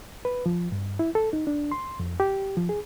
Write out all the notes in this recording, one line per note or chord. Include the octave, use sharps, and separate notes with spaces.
B4
F3
G2
E4
A4
D#4
D4
C6
F2
G4
F3
G#4